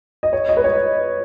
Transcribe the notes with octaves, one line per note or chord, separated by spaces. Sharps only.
D#5
C#5
D#5
B4
C#5